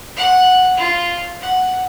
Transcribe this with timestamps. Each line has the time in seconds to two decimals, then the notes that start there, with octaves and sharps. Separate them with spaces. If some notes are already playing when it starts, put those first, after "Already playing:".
0.17 F#5
0.77 F4
1.41 F#5